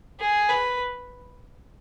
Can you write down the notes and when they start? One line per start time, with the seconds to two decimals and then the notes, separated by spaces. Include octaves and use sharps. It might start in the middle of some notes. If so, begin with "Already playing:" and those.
0.20 G#4
0.49 B4